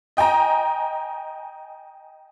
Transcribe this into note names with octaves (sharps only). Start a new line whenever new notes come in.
D#5 G5 G#5 A#5